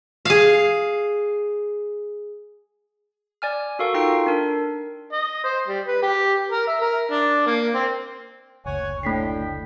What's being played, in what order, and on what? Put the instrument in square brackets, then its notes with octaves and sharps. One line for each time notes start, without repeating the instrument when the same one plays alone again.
[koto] G#4 F5
[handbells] D5 G#5 F6
F#4 A4 A#4 F5 C#6
D#4 F4 A4 G5 C7
D4 A#4
[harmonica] D#5
C5
G3
B4
G4
A#4
E5
A#4
D4
A#3
C4
[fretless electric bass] F#1 D2 [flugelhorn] C#5 [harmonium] F#5 G#5
[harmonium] A2 D3 [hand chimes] A3 B6 C7 [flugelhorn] G5